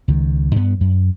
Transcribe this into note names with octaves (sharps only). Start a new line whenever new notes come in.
C#2 D#3
G2 B3
F#2